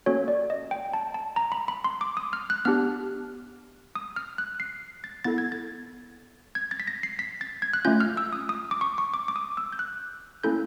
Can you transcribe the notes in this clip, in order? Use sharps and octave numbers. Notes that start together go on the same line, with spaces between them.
A#3 C#4 F#4 A4 C#5
D5
D#5
G5
A5
A5
A#5
B5
B5
C6
D6
D#6
F6
F#6
B3 D4 G4 F6
D#6
F6
F#6
C7
A6
B3 E4 A4 A6
G#6
A6
G#6
A6
B6
A#6
C7
B6
A6
G#6
F#6
A3 C#4 F4 G6
F6
E6
D#6
D#6
D6
C#6
C#6
D6
D6
D#6
E6
G6
F#6
A#3 C#4 E4 A4 G6